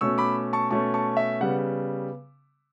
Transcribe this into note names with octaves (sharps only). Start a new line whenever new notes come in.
B2 A3 C#4 C#6 E6
B5 D6
A5 C#6
B2 A3 C#4 A5 C#6
A5 C#6
E5
C#3 G3 B3 F#5